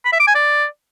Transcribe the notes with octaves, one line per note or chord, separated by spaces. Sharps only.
B5
E5
D6
G#5
D5